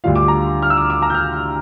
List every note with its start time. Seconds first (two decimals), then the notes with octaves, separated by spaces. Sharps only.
0.04 D2 D3 G3 D4 F4 F5
0.16 D6
0.28 A#5
0.62 F6
0.70 E6
0.78 D6
0.90 D6
1.02 A#5
1.10 G6
1.14 F6